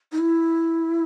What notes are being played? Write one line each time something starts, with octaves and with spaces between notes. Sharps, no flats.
D#4
E4